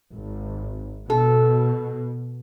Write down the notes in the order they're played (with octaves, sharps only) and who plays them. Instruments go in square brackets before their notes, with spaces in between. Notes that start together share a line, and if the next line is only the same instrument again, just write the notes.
[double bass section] G#1
[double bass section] B2 [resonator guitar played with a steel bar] A4